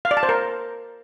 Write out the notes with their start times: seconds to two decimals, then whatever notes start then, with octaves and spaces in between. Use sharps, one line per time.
0.05 F5
0.11 D5
0.17 A5
0.23 C5
0.29 A#4